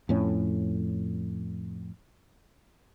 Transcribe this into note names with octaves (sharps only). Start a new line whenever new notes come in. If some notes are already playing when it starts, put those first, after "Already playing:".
F2 A2 C#4